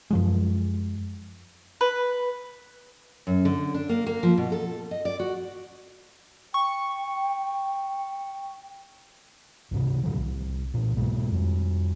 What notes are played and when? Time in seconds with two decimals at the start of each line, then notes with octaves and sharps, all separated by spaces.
0.11 F#2 F3 G#3
1.81 B4
3.27 F#2
3.45 D3
3.74 D4
3.89 A#3
4.07 A#3
4.23 F3
4.38 B2
4.52 A4
4.91 D#5
5.05 D5
5.20 F#4
6.54 G5 C#6
9.71 C#2 G#2 C3
10.03 A2 D3 E3 F#3
10.18 C2
10.74 C2 A#2
10.97 G#2 B2 G#3
11.32 F2 G3